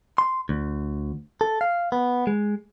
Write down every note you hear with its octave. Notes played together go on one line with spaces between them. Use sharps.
C6
D2
A4
F5
B3
G#3